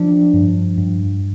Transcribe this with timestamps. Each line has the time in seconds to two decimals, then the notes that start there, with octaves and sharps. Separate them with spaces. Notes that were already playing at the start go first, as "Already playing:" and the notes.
Already playing: F3 D4
0.34 G2
0.78 G2